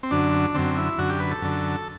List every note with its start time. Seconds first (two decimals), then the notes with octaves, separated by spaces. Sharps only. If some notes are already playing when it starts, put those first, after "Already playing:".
0.03 C4
0.11 F#2 D3 D4
0.54 F#2 D3 C4
0.77 E4
0.98 F#2 D3 F#4
1.10 G4
1.20 B4
1.31 A4
1.42 F#2 D3